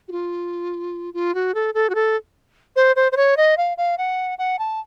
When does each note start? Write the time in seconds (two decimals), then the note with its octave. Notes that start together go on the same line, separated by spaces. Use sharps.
0.08 F#4
0.12 F4
1.14 F4
1.35 F#4
1.55 A4
1.74 A4
1.90 F#4
1.95 A4
2.76 C5
2.96 C5
3.12 C5
3.17 C#5
3.37 D#5
3.57 F5
3.78 F5
3.98 F#5
4.38 F#5
4.59 A5